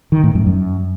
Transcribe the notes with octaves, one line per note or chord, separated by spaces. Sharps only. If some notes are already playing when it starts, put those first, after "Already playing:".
D#3
A2
F#2
F#2